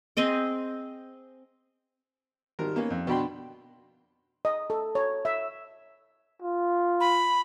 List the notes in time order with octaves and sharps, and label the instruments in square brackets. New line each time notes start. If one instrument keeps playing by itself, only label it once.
[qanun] C4 G#4 D#5 G5
[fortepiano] G#1 G3 A#4
A#3 B3 C#4
F2
B2 D3 D4 G5 B5 C6
[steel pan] D#5
A4
C#5
E5
[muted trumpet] F4
[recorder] B5